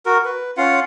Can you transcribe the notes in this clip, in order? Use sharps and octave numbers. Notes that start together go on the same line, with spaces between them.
F#4 A#4
B4
C#4 F4 F5 F#5